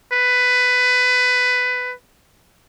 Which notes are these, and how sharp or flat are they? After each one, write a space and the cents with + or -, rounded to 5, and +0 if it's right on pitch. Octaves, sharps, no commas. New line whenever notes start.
B4 +15